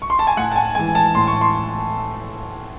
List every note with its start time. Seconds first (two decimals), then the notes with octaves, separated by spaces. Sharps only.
0.02 C#6
0.10 C6
0.19 A5
0.27 G#5
0.37 A2 F#5
0.51 A5
0.56 G#5
0.75 E3 G#3 G#5
0.95 A5
1.14 A2 C6
1.27 C#6
1.41 C6